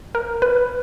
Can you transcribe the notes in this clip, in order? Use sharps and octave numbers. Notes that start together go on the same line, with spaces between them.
A#4
B4